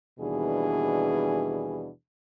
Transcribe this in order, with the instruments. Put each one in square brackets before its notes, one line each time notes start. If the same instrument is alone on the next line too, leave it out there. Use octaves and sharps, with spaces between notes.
[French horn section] D#2 B2 E3 G3 D4 G#4